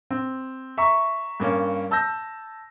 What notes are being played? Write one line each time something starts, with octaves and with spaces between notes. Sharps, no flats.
C4
E5 A#5 C#6
G2 A#3 C#4
A5 E6 G6 A#6